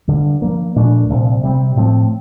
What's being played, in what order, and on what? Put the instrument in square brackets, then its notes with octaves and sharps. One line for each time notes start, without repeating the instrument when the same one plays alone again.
[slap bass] G2 D3 G3
G2 F3 A#3
A#2 F3 A3 D4
C2 A#2 F3
C3 G3 C4
A2 F3 C4